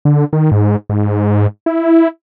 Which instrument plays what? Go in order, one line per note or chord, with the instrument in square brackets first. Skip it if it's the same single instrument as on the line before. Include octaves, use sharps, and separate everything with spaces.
[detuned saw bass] D3
D#3
G#2
G#2
E4